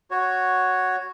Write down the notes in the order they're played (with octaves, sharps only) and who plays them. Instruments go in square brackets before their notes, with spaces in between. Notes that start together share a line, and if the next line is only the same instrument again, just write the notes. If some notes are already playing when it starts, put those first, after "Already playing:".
[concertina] F#4 C#5